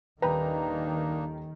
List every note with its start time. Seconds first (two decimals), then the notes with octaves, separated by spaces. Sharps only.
0.22 D#1 D#3 A#3 D4 D#4 B4 G5 A#5